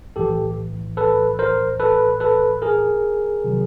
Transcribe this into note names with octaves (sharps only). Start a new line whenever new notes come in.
B1 A2 E3 G4 A4
A4 B4
A#4 C5
A4 B4
A4 B4
G#4 A#4
C3 D#3 F#3